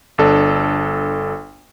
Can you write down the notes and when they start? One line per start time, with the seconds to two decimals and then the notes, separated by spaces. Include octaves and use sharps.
0.18 G1 D4 A4